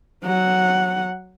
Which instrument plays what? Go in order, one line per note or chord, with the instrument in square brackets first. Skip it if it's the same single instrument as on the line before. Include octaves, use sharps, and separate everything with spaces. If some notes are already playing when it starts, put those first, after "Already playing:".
[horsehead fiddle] F#3 F#5